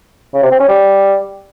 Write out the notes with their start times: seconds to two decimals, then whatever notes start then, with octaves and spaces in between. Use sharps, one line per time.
0.34 C#3
0.43 C3
0.51 C4
0.60 C#4
0.68 G3